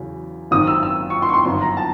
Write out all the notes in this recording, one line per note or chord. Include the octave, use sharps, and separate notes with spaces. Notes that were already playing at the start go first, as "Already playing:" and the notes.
Already playing: E2 C#3 F#3
G#1 F#2 D#3 D#6
E6
E6
C#6
C6
C#6
C6
G1 F#2 D#3 F#3 B3 C6
A#5
A5